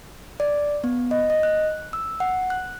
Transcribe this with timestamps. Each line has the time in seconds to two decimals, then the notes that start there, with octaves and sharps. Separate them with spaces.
0.40 D5
0.84 B3
1.11 D#5
1.30 D#5
1.43 F#6
1.93 E6
2.20 F#5
2.50 F#6